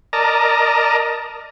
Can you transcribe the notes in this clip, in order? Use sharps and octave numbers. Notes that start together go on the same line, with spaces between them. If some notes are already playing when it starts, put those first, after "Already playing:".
A#4 D5 D#5 A5 A#5